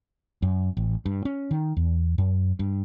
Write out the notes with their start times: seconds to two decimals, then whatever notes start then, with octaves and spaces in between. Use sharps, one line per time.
0.42 F#2
0.77 A1
1.06 G2
1.25 C#4
1.51 D#3
1.77 E2
2.18 F#2
2.59 G2